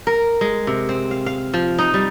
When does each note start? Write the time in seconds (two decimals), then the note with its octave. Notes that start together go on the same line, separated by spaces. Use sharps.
0.07 A#4
0.41 G#3
0.67 C3
0.89 C4
1.11 F5
1.26 F5
1.54 F3
1.78 D#4
1.94 G3